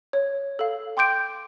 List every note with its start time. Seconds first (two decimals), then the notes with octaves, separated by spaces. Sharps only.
0.13 C#5
0.59 A4 F5
0.97 G5 C6 D6 G6 D7